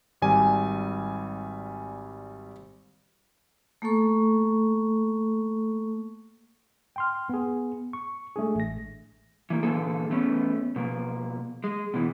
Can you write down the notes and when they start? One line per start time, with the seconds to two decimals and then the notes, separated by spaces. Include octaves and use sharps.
0.22 G#1 G3 G#5
3.82 A3 A#3 A4 C#6
6.96 G5 C6 F6
7.29 B3 G#4
7.93 C#6
8.36 G#3 A3 D4 G#4
8.55 A1 A#6
9.50 E3 A#3
9.63 A#2 D3 E3 A#3 G#4 A4
10.10 E2 A3 B3 C#4
10.76 B2 F3 A#3
11.64 G#3
11.94 B2 E3